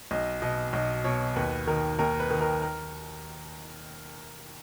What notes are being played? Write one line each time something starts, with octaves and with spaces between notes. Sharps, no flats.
B1 D#5
B2 D#5
B1 D#5
B2 C#5
D#2 B4
D#3 A#4
D#2 A#4
B4
D#3
A#4
A#4